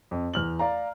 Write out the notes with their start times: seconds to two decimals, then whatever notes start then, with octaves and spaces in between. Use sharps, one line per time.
0.11 F2
0.34 E2 F6 F#7
0.59 D5 F5 A#5